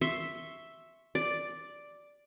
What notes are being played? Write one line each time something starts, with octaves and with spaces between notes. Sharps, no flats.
E5 C6 C#6
D5